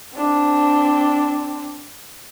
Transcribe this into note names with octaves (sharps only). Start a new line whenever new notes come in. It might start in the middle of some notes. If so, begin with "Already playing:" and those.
C4 D4